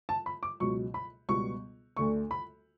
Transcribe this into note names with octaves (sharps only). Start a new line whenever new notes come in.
A5
B5
D6
C#2 B2 F#3 C#6
B5
C#2 B2 G3 B3 C#6
D2 D3 A3 C#6
B5